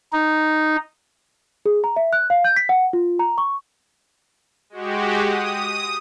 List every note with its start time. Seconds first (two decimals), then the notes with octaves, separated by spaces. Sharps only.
0.13 D#4
1.66 G#4
1.84 A#5
1.96 E5
2.13 F#6
2.30 F5
2.45 G6
2.56 B6
2.69 F#5
2.93 F4
3.19 A#5
3.38 C#6
4.70 G#3 F#4 G4
5.19 D#6